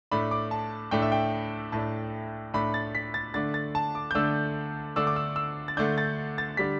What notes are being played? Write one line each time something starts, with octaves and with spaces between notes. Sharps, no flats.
A2 A3 D4 B5
D6
A5
A2 A3 D4 G5
E5
G5
A2 A3 D4 A5
A2 A3 D4 B5
A6
B6
A6
D3 A3 D4 A6
A6
A5
D6
G6
D3 A3 D4 E6
D3 A3 D4 E6
D6
E6
E6
A6
D3 A3 D4 G6
A6
A6
D3 G3 D4 B6